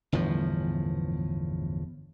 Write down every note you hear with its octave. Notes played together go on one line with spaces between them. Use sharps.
G1 E2 A2 F3